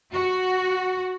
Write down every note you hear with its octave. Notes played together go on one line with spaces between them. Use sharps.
F#4